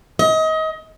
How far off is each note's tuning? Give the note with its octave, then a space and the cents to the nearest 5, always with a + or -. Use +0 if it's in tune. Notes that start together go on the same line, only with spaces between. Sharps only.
D#5 +30